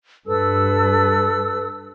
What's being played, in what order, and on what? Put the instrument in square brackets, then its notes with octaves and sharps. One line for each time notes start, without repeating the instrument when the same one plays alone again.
[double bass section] G2 [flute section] A4 B4 E6